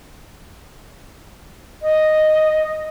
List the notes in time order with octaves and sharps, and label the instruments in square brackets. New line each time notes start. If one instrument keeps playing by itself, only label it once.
[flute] D#5